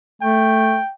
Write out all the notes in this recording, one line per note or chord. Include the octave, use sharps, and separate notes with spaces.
A3 G5